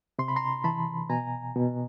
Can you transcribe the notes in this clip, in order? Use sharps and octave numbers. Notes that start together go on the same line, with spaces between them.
C3 C6
B5
A#5 C6
E3 A5 B5
B2 G#5 A#5
B2